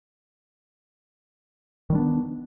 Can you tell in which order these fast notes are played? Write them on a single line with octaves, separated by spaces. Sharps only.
D#3 G3 D4 B3